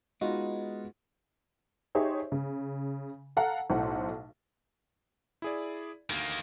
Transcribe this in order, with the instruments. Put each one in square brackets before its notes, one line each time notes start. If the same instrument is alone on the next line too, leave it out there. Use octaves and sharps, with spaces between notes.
[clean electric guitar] G#3 B3 [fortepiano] D#4 F4 F#4
[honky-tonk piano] D#4 G4 G#4 C5 C#5 E5
C#3
A4 F5 F#5 A5 A#5
B1 A2 C5 F#5
[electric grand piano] E4 G#4 D5
[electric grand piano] D2 [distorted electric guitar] D#3 A#3